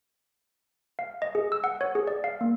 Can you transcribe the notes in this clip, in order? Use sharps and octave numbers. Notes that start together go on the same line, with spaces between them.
F5
D#5
G#4
E6
F#5
C#5
G#4
D5
F5
A#3